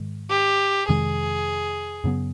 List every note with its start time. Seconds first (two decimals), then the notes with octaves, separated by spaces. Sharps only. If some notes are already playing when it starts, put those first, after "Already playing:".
Already playing: G#2 D#3 G#3
0.31 G4
0.89 F2 C3 D#3 G#3 G#4
2.04 F#2 C#3 F#3 B3